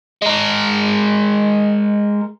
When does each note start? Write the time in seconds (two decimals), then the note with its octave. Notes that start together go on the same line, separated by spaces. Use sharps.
0.22 G#3 A#4